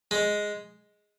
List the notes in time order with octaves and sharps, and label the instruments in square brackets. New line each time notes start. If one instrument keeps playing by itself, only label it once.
[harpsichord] G#3